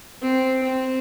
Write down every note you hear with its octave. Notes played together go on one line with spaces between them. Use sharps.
C4
C4